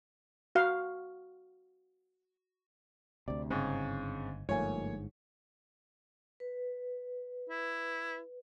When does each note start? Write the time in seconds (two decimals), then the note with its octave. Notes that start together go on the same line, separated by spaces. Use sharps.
0.55 F#4 F5
3.28 D2 C3 D5
3.50 G1 G#2 C#3 C4
4.49 G1 G#2 F3 A3 A#3 C#5 G#5
6.40 B4
7.49 E4